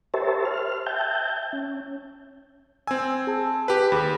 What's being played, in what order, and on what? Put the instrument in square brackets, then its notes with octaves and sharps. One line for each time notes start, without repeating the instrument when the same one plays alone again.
[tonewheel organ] G4 A#4 C5 C#5 E5 A5
C5 F6
E5 G5 A5 G6
C#4
[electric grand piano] C4 G#5 [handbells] E6 G#6
[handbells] G#4 A5
[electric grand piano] G4 B4
[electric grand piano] D#2 [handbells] G#4 B4 B5